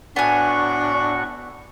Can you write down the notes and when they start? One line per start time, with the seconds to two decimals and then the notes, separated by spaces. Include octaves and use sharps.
0.16 A2 B3 D4 F#4 G#5 C#6